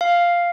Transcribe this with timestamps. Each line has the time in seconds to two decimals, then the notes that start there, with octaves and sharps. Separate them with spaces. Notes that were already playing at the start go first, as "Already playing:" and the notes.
0.01 F5